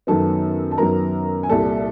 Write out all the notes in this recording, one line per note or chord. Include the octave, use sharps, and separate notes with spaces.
F#2 D#3 F#3 B3 A4 A5
A5
F#2 D#3 F#3 B3 A#4 A#5
G#5
C2 A#2 G3 A4 A5